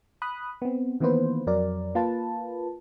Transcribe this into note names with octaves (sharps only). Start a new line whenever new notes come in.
B5 D#6 F#6
B3 C4
D#3 E3 A#3 B3 B4 C5
F2 F#3 A#4 D5
A#3 F4 B4 A5